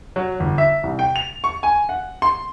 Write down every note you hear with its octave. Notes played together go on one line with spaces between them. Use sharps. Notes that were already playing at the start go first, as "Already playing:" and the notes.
F#3
G1
E5
C2
G5
F7
C#6
G#5
F#5
C6